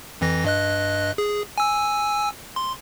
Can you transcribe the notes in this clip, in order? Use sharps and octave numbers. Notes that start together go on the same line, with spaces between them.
F2 E3 A#6
G2 D#5 F#6
G#4
G#5 E6
C6